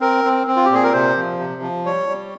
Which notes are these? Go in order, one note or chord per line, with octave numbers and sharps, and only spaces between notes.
C4 A#4
C4
C4
F4
G4
A#2 G#4
A#4
C3 C5
F3
C3
F3
G3 C#5
G3